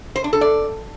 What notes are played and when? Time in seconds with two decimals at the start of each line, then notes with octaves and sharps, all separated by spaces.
0.16 C5
0.24 D4
0.33 A4
0.41 D5